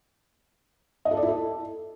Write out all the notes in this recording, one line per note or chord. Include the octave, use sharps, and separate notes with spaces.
D#5
A4
D5
E4
A4